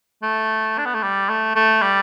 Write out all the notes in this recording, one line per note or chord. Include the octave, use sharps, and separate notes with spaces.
A3
D4
B3
A3
G3
A3
A3
G3